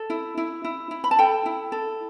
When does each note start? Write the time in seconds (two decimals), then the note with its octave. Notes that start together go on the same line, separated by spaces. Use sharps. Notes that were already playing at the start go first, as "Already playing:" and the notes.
Already playing: A4
0.10 E4
0.38 E4
0.64 E4
0.91 E4
1.04 B5
1.11 A5
1.19 A4 G5
1.46 E4
1.72 A4